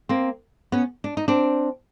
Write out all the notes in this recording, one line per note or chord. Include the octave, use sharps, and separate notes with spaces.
A#3 C4
B3 C#4
D4
D#4
C4 D4